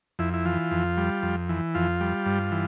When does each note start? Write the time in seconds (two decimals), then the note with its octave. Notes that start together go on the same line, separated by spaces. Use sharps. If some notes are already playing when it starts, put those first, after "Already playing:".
0.19 F2 E4
0.34 E4
0.45 E3 F4
0.71 F2
0.97 G3
1.22 F2
1.49 E3
1.75 F2 F4
2.00 G3
2.26 G2
2.52 E3